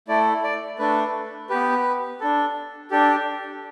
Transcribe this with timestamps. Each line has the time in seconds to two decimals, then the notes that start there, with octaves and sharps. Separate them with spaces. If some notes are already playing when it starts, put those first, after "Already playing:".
0.08 A3 E4 A4 D5
0.44 D5
0.79 A3 D4 A4 B4
1.50 B3 G4 B4
2.20 D4 A4
2.91 D4 G4 A4